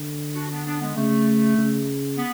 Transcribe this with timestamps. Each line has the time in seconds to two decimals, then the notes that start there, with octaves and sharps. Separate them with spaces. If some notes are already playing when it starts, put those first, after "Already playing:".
Already playing: D3
0.36 D4 F#4
0.51 B3 D4
0.66 B3 D4
0.81 G#3 B3
0.97 C#3 A3
1.58 C#3
2.18 B3